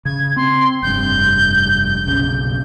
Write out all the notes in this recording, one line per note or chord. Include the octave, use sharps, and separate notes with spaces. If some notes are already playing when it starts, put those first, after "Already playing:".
C#3 G#6
C4 C6
F1 G2 G6
G6
B1 F#2 C#3